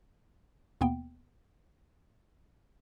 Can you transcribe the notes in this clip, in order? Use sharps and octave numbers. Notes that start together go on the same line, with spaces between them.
D#2 B2 A#3 B3 G5